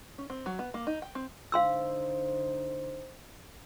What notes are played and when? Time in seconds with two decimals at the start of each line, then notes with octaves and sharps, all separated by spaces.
0.18 C#4
0.30 C4
0.46 F#3
0.59 B3
0.74 A#3
0.87 D#4
1.02 G5
1.15 C4
1.52 D3 D#4 C5 F5 C6 E6